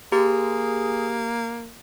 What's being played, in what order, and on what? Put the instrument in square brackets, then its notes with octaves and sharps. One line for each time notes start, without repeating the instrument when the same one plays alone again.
[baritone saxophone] A#3 [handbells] G4 [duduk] G#4